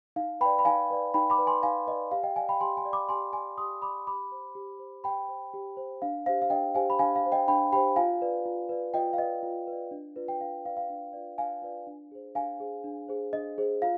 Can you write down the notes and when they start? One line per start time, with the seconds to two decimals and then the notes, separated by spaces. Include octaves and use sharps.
0.16 D#4 F5
0.41 B4 G5 B5
0.45 D5
0.59 B5
0.65 D#4 F5 G#5
0.91 B4 D5
1.14 D#4 G5 B5
1.30 B5 D6
1.39 B4 D5
1.47 G#5 C6
1.63 D#4 F5 G#5
1.87 B4 D5 D#5
2.11 G4 F5
2.23 D#5 G5
2.36 D5 F5 G#5
2.49 G5 B5
2.60 G4 G#5 C6
2.77 G#5 C6
2.85 D5
2.93 B5 D6
3.09 G4 G#5 C6
3.33 D5 G#5 C6
3.57 G4 C6 D#6
3.82 D5 B5 D6
4.07 G4 B5 D6
4.32 C5
4.55 G4
4.79 C5
5.04 G4 G5 B5
5.29 C5
5.54 G4
5.77 C5
6.02 D4 F5
6.26 G4 C5 F5
6.42 F5
6.50 D4 D#5 G5
6.75 G4 C5 F5 G#5
6.90 B5
6.99 D4 F5 G#5
7.16 F5
7.24 G4 C5
7.32 D#5 G5
7.48 D4 G5 B5
7.72 G4 G5 B5
7.76 C5
7.96 F4 F5 G#5
8.22 B4 D5
8.45 F4
8.69 B4 D5
8.94 F4 D#5 G5
9.13 F5
9.18 B4 D5 D#5
9.43 F4
9.67 B4
9.72 D5
9.91 D4
10.16 F4 B4 D5
10.28 G5
10.40 D4 F5
10.65 F4 B4 D5 F5
10.77 F5
10.90 D4
11.13 F4 B4 D5
11.38 D4 F5 G#5
11.62 F4 B4 D5
11.87 D4
12.11 G#4 C5
12.35 D4 F5 G#5
12.60 G#4 C5
12.84 D4
13.08 G#4 C5
13.33 D4 D#5
13.58 G#4 C5
13.82 F4 F5